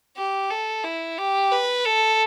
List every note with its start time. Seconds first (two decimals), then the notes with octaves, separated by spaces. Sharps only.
0.17 G4
0.50 A4
0.84 E4
1.18 G4
1.52 B4
1.85 A4